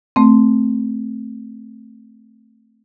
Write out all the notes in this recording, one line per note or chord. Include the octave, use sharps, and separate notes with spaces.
A3 C4